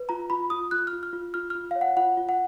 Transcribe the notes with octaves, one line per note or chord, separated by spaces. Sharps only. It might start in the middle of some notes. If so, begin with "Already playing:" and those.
Already playing: B4
F4 A#5
F4 B5
F4 D#6
F4 F#6
F6
F4
F6
F4
F4 F6
F4 F6
C#5 F5
F#5
F4 F#5
F4
F#5